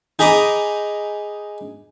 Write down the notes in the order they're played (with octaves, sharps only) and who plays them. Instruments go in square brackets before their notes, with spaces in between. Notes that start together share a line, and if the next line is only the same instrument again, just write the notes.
[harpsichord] D#4 G#4 A#5 B5 D6 D#6